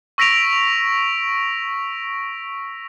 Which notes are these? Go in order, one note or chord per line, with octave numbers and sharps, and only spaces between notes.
C#6 E6 A#6 B6 D7 F7